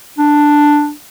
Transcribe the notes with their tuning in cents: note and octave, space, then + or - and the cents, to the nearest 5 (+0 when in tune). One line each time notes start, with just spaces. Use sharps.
D4 +5